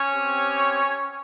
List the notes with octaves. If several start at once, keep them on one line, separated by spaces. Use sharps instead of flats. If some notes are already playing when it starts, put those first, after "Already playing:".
Already playing: C#4 C#5
C4 G4